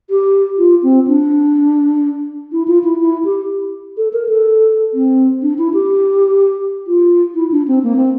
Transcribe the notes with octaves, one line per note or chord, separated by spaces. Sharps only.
G4
F4
C4
D4
E4
F4
E4
E4
G4
A4
A#4
A4
C4
D4
E4
G4
F4
E4
D4
C4
A#3
C4